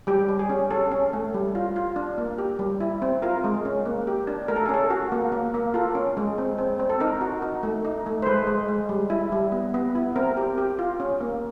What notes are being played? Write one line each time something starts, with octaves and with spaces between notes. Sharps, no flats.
G3 G4
G3
G#4
C#4
C#4 A4
C#4
A3
G3
F4
F4
D4
A#3
G4
G3
E4
C4
F4 A#4
G#3
C#4
A#3
G4
D4
A3 A#4
A4
G#4
C#4 A4
F#4
A#3
A#3
A#3
F4 A4
C#4
G#3
C4
C4
C4
A4
D#4 A#4
F#4
D#4
A3
D#4
A3
C5
G#3 B4
G#3
G#3
G3
E4
G3
B3
B3
E4
C4 A#4
G4
G4
F4
C#4
A#3